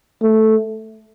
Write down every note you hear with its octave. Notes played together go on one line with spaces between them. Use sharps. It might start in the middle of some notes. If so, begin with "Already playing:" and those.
A3